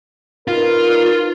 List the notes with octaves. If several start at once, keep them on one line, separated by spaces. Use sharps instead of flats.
D#4 F4 A#4 B4